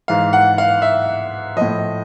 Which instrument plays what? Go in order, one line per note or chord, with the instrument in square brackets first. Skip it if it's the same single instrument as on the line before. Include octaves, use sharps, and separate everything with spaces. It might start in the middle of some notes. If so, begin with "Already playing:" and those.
[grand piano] G#2 E3 F5
F#5
F5
E5
A2 F3 D#5